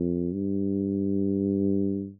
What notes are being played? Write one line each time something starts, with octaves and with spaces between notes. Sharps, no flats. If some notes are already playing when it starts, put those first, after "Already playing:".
Already playing: F2
G2